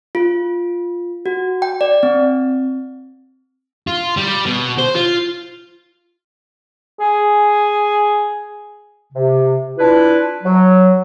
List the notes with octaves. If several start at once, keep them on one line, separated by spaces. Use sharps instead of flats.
F4
F#4
G5
D5
C4
F4
G3
B2
C5
F4
G#4
C3
D4 E4 F4 B4
F#3